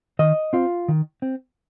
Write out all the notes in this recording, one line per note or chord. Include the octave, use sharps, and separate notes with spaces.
D#3 D#5
C4 F4
D#3
C4